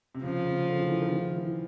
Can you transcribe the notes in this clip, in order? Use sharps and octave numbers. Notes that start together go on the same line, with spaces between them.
C3
C#3 F3
C#3
D3
E3
E3
D#3
D#3
E3